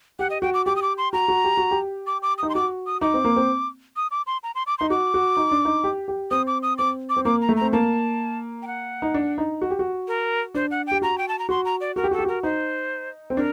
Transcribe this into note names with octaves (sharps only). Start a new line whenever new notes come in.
G4 F#5
D#5
F#4 G5
D6
G4 D6
D#6
D6
C6
F#4 A#5
F#4
G4
F#4
G4
D6
D6
D#4 D#6
C6
F#4 D6
D#6
D#4 D6
C4
A#3
C4
D#6
D6
C6
A#5
C6
D6
D#4 C6
F#4 D6
F#4
D#4
D4
D#4
G4
G4
C4 D#6
D6
D#6
C4 D6
D6
C4
A#3 D6
A#5
A3
C4 A#5
A#3 A5
G5
F#5
D#4
D4
D#4
F#4
G4
F#4
A#4
D4 C5
F#5
G4 G5
F#4 A#5
G5
A5
A#5
F#4 C6
A#5
D5
F#4 A#4
G4
F#4 A4
G4
F#4 A#4
D#4 C5
C4
D4 A#4